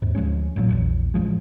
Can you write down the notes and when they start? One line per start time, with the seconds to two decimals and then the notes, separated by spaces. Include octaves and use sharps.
0.02 D#2 G#2
0.15 D2 F3 G#3 C#4
0.56 A1 G2 A#2 F#3
0.70 A#1 E2
1.14 A1 C#3 F3 G#3